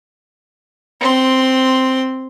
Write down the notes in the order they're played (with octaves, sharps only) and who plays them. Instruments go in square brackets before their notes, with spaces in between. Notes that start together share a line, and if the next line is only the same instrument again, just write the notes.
[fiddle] C4 C6